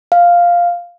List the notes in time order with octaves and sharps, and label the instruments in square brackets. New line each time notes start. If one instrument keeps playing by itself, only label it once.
[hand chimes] F5